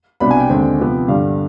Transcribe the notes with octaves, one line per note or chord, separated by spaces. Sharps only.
C2 B2 B3 D4 B5
G#5
G5
D#2 D3 G#3 C4
C3 F3 B3
G2 D3 G3 F5